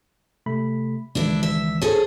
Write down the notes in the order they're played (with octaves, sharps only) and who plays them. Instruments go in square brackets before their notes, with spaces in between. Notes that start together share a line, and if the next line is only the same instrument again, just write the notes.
[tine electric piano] C3 A3 B5
[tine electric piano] C#2 D#3 E3 [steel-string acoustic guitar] D4 E4
[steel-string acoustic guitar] E5
[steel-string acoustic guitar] G#4 A4 [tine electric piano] C5 C#5